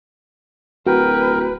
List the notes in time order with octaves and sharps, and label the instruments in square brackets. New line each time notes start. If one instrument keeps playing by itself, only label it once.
[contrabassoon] D1 [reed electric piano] F#4 [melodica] A#4 G5 [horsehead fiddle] B4